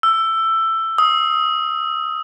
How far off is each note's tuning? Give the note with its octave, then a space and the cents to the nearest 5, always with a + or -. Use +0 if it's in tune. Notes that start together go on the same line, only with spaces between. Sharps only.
E6 +15
D#6 +15